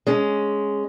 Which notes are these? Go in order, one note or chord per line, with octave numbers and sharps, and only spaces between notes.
G#3 C#4